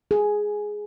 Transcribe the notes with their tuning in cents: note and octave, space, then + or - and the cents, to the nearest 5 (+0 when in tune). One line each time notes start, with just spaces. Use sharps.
G#4 +5